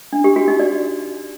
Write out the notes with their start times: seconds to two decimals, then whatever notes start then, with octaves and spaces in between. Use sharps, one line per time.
0.13 D4
0.24 G4
0.36 F#4
0.48 D#4
0.60 D5